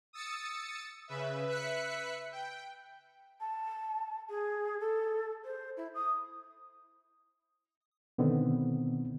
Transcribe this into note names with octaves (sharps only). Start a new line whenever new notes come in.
D#6 E6 A6 C#7
C#3 B4 E5
B4 E5 F#6 B6 C#7
G5
A5
G#4
A4
C5
E4
D#6
B2 D3 D#3 B3 C4